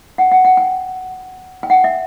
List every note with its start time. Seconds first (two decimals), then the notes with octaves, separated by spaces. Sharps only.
0.18 F#5
0.32 F#5
0.45 F#5
0.57 G5
1.63 G5
1.70 F#5
1.84 E5